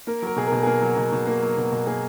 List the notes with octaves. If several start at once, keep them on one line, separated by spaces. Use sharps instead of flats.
A#3 A#4
F#3 A#4
B2 G#4
B2 A#4
G#4
A#3 A#4
F#3
B2
B2
A#3
F#3
B2
B2
A#3 G#4